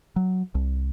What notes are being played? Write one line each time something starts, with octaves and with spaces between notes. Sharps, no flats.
F#3
C2